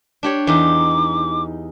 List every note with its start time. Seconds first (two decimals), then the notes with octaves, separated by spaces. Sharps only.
0.23 D4 G4 C#5
0.47 E2 D#4 D6